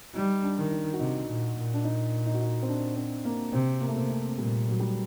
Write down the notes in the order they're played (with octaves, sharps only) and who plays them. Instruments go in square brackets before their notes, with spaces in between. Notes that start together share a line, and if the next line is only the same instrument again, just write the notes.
[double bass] G3 [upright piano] D#4
[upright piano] D4
[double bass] D#3
[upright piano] D#4
F#4
[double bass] C3 [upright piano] D#4
[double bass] A#2
A#2
[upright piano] D4
D#4
D#4
F#4
D#4
C4
D4
C4
A#3
[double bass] C3 [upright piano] C4
[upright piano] A#3
A3
[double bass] C3 [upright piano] A#3
[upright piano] A3
[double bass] A#2 [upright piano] G3
[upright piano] F#3
G3